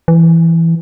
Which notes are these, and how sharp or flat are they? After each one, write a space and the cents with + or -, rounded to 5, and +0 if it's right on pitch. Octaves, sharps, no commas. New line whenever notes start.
E3 +5